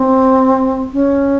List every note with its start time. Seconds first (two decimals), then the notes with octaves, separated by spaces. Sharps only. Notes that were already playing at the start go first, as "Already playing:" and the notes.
Already playing: C4
0.93 C#4